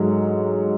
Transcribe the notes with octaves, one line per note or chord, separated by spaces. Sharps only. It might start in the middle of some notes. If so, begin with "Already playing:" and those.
Already playing: G#2 F#3 A3